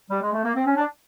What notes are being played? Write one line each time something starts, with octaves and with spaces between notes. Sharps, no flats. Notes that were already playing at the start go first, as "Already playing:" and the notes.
G3
G#3
A3
A#3
C4
C#4
D4